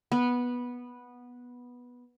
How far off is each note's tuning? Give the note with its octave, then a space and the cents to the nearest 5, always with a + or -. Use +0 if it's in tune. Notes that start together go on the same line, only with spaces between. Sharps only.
B3 -10